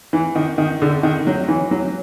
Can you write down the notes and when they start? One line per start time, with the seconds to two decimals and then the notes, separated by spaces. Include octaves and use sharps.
0.13 E3
0.35 D#3
0.58 D#3
0.82 D3
1.03 D#3
1.27 F#3
1.48 E3
1.71 F#3